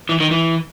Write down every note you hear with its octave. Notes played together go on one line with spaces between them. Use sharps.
E3
D#3
E3